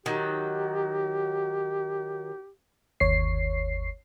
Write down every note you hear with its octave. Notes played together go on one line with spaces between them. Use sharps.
D#3 F#3 G4
G1 D#2 C#5 C7